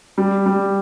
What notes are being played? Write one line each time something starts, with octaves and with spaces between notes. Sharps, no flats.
G3
G3